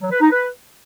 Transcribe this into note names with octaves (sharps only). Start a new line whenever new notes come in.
F#3
B4
D#4
B4